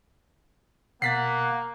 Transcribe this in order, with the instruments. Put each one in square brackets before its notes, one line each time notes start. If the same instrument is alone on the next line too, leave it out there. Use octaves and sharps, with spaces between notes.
[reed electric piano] B2 [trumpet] A#3 [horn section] F#5 [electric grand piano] A6 B6 C7